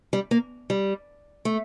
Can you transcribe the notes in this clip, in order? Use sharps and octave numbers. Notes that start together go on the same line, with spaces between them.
G3
A#3
G3
A3